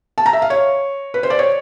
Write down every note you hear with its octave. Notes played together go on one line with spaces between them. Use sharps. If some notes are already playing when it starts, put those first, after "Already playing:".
A5
A#5
E5
F5
C#5
B4
C5
D5
C#5